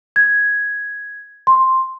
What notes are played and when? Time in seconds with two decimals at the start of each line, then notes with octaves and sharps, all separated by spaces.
0.16 G#6
1.47 C6